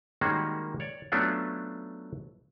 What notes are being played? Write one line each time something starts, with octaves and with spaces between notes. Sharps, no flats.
D#3 G3 G#3 A#3 C#4 F#4
C#5 D5
F#3 A3 B3 C#4 D4 F4